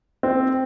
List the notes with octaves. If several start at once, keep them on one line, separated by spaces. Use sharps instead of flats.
C4